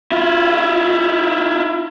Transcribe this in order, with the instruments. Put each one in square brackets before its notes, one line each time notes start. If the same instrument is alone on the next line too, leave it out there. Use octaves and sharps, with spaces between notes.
[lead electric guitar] E4 F4